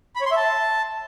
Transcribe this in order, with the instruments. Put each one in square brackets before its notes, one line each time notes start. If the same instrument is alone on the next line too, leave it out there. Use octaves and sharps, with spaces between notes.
[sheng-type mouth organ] B5
C#5
C6
E5
A5